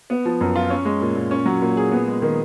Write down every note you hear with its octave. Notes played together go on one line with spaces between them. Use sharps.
B3
F3
F#2
F4
C#4
G#3
A#2
A#2
C#4
F#3
A#2
G#4
B3
G#3
D#3